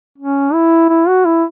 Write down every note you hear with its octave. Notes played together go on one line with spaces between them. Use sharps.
C#4
E4
E4
F#4
E4